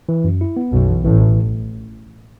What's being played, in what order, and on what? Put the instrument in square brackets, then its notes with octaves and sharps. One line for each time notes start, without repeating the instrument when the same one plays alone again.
[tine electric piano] E3
F#2
E4
B3
[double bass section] B1 B2 [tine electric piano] F#2
[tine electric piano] E3
[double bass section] A1 A2 [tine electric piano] E3
[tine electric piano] E3